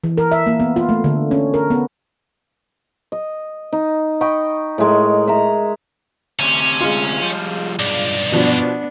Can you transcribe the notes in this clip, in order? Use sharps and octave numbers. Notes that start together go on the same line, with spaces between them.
E3
A#4
E5
A#3
B3
F4
A3
D3
C#4
A#4
B3
D#5
D#4
D#5 G5 B5 C#6
A2 G#3 A#4
E5 A#5
D2 C3 C#4
G#3 F4
F3 G3
B1 G2 D5
B2 F3 B3 D4